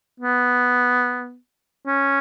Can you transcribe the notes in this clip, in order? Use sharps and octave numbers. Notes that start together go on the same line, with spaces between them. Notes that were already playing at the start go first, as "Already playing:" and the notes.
B3
C#4